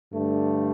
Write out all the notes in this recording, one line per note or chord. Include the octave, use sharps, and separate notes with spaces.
G2 D3 A3